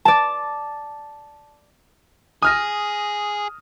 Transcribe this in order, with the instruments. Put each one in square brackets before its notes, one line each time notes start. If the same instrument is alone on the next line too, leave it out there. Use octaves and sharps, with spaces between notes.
[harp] D5 A5
[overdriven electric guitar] G#4 [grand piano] D#6 F6 A#6